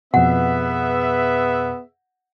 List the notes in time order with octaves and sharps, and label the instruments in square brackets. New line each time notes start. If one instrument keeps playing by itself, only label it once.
[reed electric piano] F2 B2 [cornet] B3 [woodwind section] G#4 B4 E5 [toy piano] F#5